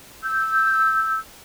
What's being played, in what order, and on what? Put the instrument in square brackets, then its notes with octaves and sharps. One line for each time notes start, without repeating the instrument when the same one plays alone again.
[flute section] E6 G6